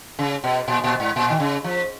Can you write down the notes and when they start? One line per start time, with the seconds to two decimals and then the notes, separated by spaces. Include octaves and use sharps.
0.19 C#3
0.44 B2
0.68 A#2
0.84 A#2
1.00 G#2
1.16 A#2
1.30 D#3
1.40 C#3
1.64 F3